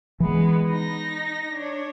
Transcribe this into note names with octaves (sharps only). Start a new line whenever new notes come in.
E3 G#3 B3
D#4 A#6
D4 C#5